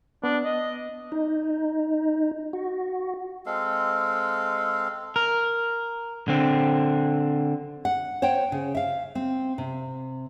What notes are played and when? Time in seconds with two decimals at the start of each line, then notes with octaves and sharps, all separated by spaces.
0.24 B3 D4
0.45 D#5
1.12 D#4
2.53 F#4
3.46 G#3 C4 A4 F5
5.16 A#4
6.28 D3 C4
7.85 F#5
8.22 C5 C#5 F#5 G5
8.52 C#3
8.75 E5 F5
9.15 C4
9.58 C3